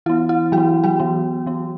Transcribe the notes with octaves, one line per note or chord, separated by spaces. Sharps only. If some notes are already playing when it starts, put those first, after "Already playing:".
E3 B3 E4
E4
E3 F#3 F#4
B3
F#3 F#4
E3 B3
E3 B3